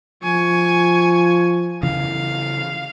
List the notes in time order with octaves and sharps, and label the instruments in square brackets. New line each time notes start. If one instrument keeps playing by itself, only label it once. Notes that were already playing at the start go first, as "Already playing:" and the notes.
[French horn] F3 [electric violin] G#5 C#6
[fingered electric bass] C#3 E3 [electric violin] F5